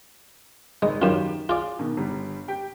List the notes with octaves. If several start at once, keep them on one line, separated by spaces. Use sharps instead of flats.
G#1 G#3
F#2 D#3 F4 G4 E7
F4 G#4 D5
B2 D#3
G1 G3
G4 G5